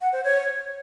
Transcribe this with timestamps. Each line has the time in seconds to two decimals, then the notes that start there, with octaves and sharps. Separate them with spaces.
0.01 F#5
0.12 C5
0.24 C#5